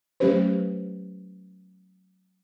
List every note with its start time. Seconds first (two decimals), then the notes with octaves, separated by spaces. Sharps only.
0.20 F#3 A3 C#4 G4 B4 C5